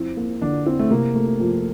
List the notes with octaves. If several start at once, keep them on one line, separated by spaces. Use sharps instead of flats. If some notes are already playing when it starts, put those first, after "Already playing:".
Already playing: F2 C4 E4
A#3
D3 D4
C4 E4
A3
C3 A#3
A3
F2